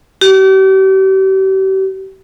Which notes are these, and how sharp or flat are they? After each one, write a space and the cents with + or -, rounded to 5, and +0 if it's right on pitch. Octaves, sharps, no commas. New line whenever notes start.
G4 -40